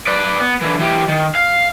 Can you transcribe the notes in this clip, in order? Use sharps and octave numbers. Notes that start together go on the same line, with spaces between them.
B4 D5
B3
D3 E3
E3 G4
D#3
F5